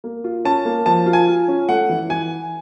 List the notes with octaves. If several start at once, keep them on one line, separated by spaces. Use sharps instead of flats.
A#3
F4
C#4 A5
A#3
F3 A5
F4
G#5
F4
C#4
A3 F#5
E3
E3 G#5